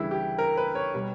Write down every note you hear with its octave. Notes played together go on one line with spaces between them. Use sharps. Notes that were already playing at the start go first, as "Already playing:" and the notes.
Already playing: D2 C#3 E3 G3 E4
G4
A#4
B4
C#5
B2 G3